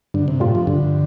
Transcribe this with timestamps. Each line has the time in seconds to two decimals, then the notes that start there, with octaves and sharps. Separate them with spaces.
0.14 G2 D3
0.28 C3
0.40 A2 G3 F4
0.55 F3
0.67 G2 D3